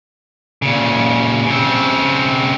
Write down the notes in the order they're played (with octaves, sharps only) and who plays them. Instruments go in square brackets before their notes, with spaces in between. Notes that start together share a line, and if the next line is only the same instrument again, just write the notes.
[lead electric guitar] A#2 C#3
C#3 C4